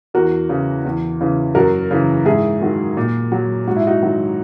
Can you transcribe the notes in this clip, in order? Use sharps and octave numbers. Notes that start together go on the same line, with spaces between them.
E2 F#4 A#4
C#3 E3
E2
C#3 E3
F#2 F#4 A#4
C#3 E3
G#2 E4 G#4
D#3 F#3
A#2
F#3
G#2 F#4
E4
D#4 F#4
D#3 F#3